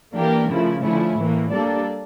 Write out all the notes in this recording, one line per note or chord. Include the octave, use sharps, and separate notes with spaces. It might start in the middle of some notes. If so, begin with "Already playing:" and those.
E3 A#3 D4 G4 A#4
C#3 F3 A3 E4
D3 F3 A3 C#4 E4
A2 E3 A#3
G3 A#3 D4 A4 D5